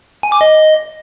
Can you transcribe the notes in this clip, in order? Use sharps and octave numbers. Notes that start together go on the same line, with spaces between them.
G#5
D6
D#5